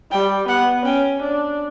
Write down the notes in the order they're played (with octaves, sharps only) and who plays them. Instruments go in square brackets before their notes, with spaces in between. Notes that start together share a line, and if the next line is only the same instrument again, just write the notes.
[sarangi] G3 [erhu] G5
[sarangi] B3 [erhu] F#5
[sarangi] C#4 [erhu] G5
[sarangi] D4